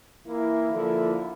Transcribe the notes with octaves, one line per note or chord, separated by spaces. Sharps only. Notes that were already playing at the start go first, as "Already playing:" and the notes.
E3 A#3 E4
D3 F3 A#3 E4 A4